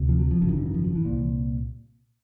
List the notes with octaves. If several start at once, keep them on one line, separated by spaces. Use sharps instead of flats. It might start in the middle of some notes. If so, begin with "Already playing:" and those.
Already playing: D2 C3
F3
F#3
F3
G#1 F#2 C#3 F3
D#3
D3
D#3
F3
F3
E3
C2 A#2